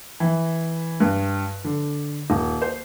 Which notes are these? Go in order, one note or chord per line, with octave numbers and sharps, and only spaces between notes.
E3
G2
D3
D#1
C5